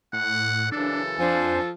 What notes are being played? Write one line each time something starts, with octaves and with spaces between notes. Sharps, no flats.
A2 F#5
F#2 C#3 E3 D4 A4
F2 F3 D4 C5 G#5